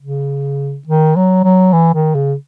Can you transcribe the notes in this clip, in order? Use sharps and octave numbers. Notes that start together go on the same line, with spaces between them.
C#3
D#3
F#3
F#3
E3
D#3
C#3